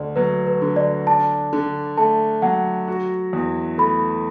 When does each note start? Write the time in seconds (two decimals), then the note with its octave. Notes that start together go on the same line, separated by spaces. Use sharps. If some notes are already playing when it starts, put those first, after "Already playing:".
Already playing: D2 A3 D5
0.16 F#3 B4
0.47 B4
0.62 D3
0.76 D5
1.07 D4 A5
1.53 D3
1.97 A3 A5
2.42 F#3 F#5
2.88 F#4
3.33 E2
3.78 A3 B5